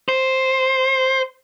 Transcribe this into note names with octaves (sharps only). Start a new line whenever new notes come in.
C5